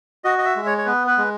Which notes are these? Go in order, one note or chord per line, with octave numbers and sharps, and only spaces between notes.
F#4 D#5
D#5
E5
G#3
C#5
C#5
B3 B4
B4
G#3